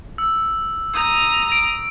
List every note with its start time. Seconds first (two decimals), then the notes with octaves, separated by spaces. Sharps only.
0.18 E6
0.94 A#5 D#6
1.52 D7